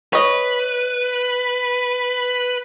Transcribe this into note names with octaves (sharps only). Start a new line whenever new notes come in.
B4 C#5 D#5